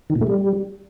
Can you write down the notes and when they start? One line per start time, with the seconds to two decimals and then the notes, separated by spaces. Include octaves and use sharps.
0.10 D#3
0.15 A#2
0.21 A3
0.27 G3